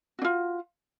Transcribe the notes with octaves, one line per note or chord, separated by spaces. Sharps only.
D4 F4 F#4